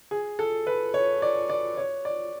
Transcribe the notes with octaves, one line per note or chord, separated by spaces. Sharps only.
G#4
A4
B4
C#5
D5
D5
C#5
D5